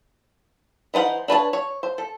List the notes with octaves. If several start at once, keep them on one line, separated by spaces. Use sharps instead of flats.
E3 D#4 C5 F#5
D4 B4 C#5 A5
C#5
C5
A4